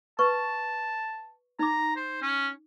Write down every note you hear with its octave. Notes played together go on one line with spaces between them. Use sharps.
B4 A5 C#6
D#4 A#5 D6
C5
C#4